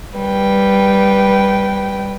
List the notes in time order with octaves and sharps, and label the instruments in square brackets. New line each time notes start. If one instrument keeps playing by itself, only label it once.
[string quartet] G3 B4 G5